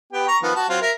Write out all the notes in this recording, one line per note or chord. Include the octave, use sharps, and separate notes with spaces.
B3 G4 G5
A#5 C#6
D#3 F3 B3
F#4 A5
F#3 C4 F4
A#4 E5